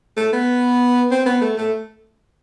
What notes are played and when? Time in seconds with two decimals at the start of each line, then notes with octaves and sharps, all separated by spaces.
0.17 A3
0.33 B3
1.11 C4
1.26 B3
1.41 A3
1.57 A3